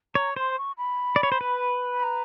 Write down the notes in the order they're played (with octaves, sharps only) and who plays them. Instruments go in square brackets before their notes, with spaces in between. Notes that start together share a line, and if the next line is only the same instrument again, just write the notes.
[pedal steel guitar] C#5 [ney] A#5
[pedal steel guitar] C5 [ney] C6
[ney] C#6
B5
[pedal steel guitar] D5
C#5
C5
B4
[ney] B5
A#5